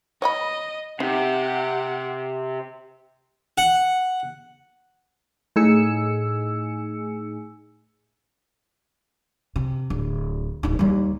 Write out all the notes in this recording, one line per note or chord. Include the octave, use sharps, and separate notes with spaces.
C#5 D#5 F#5 B5
C3 D#4 G4 F#5
F#5
A2 D#4 G#4 G#5 E6 C#7
C3
D1
D1 D#4
D#2 G3